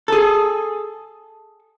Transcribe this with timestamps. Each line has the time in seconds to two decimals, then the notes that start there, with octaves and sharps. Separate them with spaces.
0.08 G#4 A4